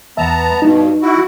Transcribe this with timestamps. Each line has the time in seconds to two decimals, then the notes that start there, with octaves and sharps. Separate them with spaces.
0.17 E2 B3 E5 A5 A#5
0.62 G2 B2 D#4
1.02 E4 F#4